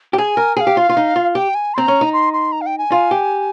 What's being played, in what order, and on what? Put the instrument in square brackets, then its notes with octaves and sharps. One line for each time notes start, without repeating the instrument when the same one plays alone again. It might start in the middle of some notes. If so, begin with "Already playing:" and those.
[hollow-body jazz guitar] G4
[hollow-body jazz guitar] G#4 [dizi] G#5
[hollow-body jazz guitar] A#4
[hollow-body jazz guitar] G#4 [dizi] G5
[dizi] F5
[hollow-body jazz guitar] G4
F4
F4
D#4
F4
[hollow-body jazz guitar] G4 [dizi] G5
[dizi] G#5
C6
[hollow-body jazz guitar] C4 [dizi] A#5
[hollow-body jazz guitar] C#4
D#4
[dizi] C6
C6
A#5
F5
G5
G#5
[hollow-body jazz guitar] F4
G4